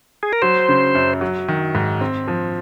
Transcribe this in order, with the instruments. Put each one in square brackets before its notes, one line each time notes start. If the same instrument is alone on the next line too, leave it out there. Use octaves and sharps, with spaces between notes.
[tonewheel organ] G#4
A#4
[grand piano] F#3 [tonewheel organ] C5
[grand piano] C#3
F#2
F#3
D#3
G#2
C4
F3